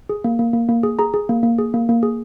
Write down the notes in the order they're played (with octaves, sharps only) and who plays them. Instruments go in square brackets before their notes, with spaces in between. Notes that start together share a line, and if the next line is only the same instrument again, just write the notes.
[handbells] G#4
A#3
A#3
A#3
A#3
G#4
G#4 A#5
G#4
A#3
A#3
G#4
A#3
A#3
G#4